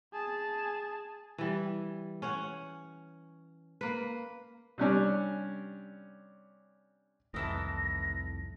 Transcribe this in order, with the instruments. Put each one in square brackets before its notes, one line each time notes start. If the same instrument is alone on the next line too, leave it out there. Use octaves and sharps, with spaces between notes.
[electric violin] G#4 A5
[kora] E3 G3
C#4 C#5 F#5
A#3 B4
[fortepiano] C3 G3 C#4 D4
[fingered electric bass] C2 F2 A2 [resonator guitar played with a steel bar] D#3 E3 A5 [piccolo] A#6